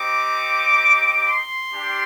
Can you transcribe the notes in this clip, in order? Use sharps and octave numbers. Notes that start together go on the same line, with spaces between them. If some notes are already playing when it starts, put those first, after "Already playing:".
Already playing: C4 D#4 G4 D6
C6
G3 D4 G4